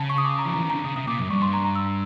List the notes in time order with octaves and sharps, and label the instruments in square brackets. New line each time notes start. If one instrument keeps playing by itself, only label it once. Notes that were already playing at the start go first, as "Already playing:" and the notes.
Already playing: [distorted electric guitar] C#3 [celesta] A5
[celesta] C#6
D#6
D6
A#5
[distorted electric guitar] F3
[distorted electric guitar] E3 [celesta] A#5
[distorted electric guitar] D#3 [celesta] A#5
[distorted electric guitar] D3
[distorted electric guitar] C#3 [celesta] D#6
[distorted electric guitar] C3 [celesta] D#6
[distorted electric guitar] A#2 [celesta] D6
[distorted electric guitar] F#2
[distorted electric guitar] G2 [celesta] C#6
[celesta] C6
A#5
A#5
E6